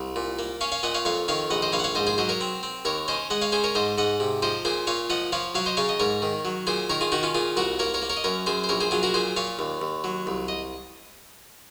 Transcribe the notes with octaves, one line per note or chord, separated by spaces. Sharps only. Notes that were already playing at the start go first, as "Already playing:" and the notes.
Already playing: C2
A#2
A#3
C#4 C#5 F5
C#5 F5
A#2 D#5 F#5
C#5 F5
F2 C#5 F5
D#3 C#5 F5
A#1 D#5 F#5
C5 D#5
A#1 C#5 F5
F#5
C#5 F5
G#2 C5 D#5
G#4 C5
F#3 C5 D#5
A#4 C#5
C4
C4
D#2 A#4 C#5
C#4 C5 D#5
G#3 D#5 F#5
C#5 F5
C#4 G#4 C5
A#4 C#5
G#2 C5 D#5
G#2 D#5 F#5
C3
F3 C5 D#5
A#2 G#4 C5
A#2 C#5 F5
F3 D#5 F#5
F3 C#5 F5
F#3 C#5 F5
C5 D#5
C#3 C#5 F5
D#5
G#2 A#4 C#5
D#3
F#3
A#2 G#4 C5
D#3 A#4 C#5
F4 G#4
D#3 D#4 F#4
C#4 F4
A#2 F4 G#4
C2 F#4 A#4
A#3 A#4 C#5
A#4 C#5
A#3
A#4 C#5
D#5
F#2 A#4 C#5
F#2 G#4 C5
C5
A#1 A#4 C#5
G#4 C5
F#3 F4 G#4
F#4 A#4
A#2 G#4 C5
A#2 C#5 F5
D#2
D#2
F#3
C2
D#5